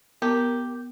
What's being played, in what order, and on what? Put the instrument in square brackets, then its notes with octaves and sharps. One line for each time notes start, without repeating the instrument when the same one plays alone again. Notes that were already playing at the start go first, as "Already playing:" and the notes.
[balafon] B3 [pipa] G4 [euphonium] A#4